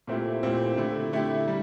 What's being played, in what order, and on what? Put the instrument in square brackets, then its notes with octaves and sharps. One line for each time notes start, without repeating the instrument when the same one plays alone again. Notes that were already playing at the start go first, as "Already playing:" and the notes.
[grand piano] A#2 A3 C4 E4 G4
A#2 A3 C4 E4 G4
D3 A3 E4 G4
D3 A3 E4 G4
G3